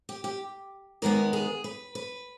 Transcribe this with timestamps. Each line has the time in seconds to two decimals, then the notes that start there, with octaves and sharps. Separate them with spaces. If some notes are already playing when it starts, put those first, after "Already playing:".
0.09 G4
0.24 G4
1.02 D#2 D#3 G#3 B3 A#4
1.33 G#4
1.64 B4
1.95 B4